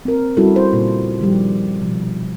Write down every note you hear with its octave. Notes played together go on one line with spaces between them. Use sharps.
C4 A#4
G3 C#4 E4 F#4 A4
C5
A#2 C#3 F4
D#3 F3 G3 G4
B2 D#3 F3